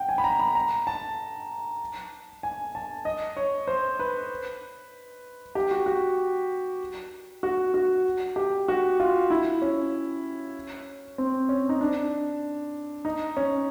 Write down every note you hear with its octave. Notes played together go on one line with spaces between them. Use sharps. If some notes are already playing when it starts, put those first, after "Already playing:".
Already playing: F#5 G5
G#5
B5
A#5
B5
A#5
A5
G#5
A5
D#5
C#5
C5
B4
G4
F#4
F#4
F#4
F#4
G4
F#4
F4
E4
C#4
C4
C#4
D#4
D4
D#4
C#4